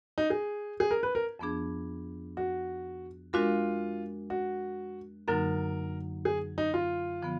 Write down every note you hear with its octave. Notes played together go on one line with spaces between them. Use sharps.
D#4
G#4
G#4
A#4
B4
A#4
F2 F3 B3 D4 G#4
F#4
G#3 D4 F4 F#4 A#4 F5
F#4
F#2 D3 F#3 A#3 D#4 A#4
G#4
D#4
F4
D3 F3 B3